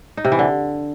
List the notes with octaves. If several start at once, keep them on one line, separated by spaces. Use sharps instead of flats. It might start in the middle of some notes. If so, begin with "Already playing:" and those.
D#4
C3
E3
D3